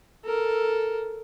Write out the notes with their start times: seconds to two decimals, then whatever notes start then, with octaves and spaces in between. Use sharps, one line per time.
0.24 A4 A#4